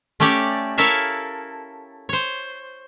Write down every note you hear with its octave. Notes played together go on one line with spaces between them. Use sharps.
A3 C#4 G4 C#5 D5
E4 A4 A#4 C#5 E5 F5
C5 C#5